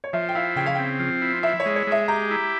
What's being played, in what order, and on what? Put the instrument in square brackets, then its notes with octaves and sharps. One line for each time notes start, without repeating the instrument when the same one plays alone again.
[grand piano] C#5
[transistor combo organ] F3 [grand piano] E5
[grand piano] G5
[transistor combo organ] E4 [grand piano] F5
[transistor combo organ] C#3 [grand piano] G5
[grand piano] F5
[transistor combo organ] C4 [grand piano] G5
[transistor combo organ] F3
E4
[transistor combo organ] E4 [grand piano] E5
[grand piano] C#5
[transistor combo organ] G#3
[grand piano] C#5
[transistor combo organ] G#3 [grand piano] E5
[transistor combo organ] G4 [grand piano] A#5
[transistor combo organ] E4